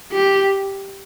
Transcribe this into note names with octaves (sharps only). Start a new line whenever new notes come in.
G4